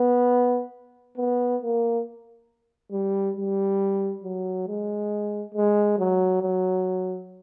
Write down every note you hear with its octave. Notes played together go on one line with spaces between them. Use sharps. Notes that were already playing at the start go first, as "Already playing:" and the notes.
Already playing: B3
B3
A#3
G3
G3
F#3
G#3
G#3
F#3
F#3